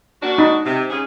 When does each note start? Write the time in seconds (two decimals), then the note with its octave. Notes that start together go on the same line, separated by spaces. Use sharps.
0.22 A#3 D4 F#4
0.38 D#4
0.66 C3
0.90 C#3 G#4